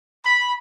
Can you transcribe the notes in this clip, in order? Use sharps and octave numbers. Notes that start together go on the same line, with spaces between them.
B5